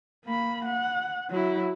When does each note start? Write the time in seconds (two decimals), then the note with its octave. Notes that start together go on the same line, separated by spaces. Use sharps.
0.25 A#3 B5
0.65 F#5
1.30 F#3 E4